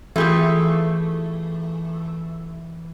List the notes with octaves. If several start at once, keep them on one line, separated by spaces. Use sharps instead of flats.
E3 A3 F4 G4 G#4